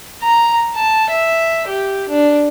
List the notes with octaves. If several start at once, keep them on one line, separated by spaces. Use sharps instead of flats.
A#5
A5
E5
G4
D4